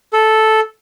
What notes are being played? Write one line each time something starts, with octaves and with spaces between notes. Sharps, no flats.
A4